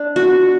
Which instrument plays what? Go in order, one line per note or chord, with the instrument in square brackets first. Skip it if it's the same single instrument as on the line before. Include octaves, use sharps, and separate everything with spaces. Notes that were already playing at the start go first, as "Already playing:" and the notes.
Already playing: [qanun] D4
F#4